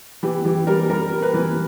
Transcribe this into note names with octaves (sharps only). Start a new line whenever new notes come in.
E3 G4
E3 G4
G3 A#4
G3 A#4
G3
B4
E3